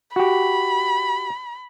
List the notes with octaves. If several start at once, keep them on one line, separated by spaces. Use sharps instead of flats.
F#4 G4 B5